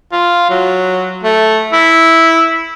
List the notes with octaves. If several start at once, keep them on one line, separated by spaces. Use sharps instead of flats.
F4
F#3
A3
E4